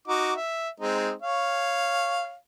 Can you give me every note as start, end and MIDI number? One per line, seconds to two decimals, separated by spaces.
0.08 0.34 63
0.08 0.34 66
0.08 0.34 86
0.36 0.69 76
0.80 1.11 56
0.80 1.11 60
0.80 1.11 63
1.22 2.35 73
1.22 2.35 77